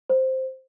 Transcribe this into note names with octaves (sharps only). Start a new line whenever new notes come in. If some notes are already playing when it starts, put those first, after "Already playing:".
C5